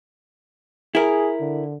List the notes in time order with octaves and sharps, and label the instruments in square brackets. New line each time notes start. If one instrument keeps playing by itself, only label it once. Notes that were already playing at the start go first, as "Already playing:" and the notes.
[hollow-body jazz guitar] E4 A#4 [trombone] G#4
[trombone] D3